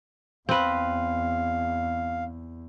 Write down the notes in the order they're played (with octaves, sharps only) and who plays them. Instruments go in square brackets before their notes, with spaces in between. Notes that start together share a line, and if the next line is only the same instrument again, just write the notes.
[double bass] E2 [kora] C4 B4 [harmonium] F5